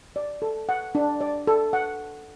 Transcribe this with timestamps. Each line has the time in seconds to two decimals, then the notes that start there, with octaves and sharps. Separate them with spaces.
0.16 D5
0.42 A4
0.69 F#5
0.95 D4
1.21 D5
1.47 A4
1.73 F#5